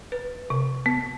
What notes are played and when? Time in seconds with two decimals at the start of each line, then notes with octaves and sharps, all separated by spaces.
0.12 B4
0.50 C3
0.86 B3